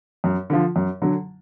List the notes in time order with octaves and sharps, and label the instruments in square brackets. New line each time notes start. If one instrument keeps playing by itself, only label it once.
[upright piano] F#2
D3 F3
F#2
D3 F#3